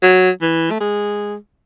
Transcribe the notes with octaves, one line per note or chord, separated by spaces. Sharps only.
F#3
E3
A3
G#3